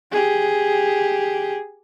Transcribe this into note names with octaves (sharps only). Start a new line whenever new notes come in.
G4 G#4